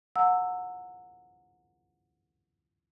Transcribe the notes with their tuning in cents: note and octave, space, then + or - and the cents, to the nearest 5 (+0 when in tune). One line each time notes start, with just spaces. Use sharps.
F#5 -25 A#5 -35 E6 +0